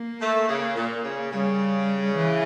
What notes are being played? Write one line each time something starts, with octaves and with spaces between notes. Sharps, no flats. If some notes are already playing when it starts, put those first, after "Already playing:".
Already playing: A#3
A3
C#3
A#2
C#3
C#3 G3
E3